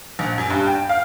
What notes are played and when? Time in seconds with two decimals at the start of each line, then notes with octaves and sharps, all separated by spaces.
0.19 A#1
0.38 F#2
0.50 G2
0.67 G5
0.89 F5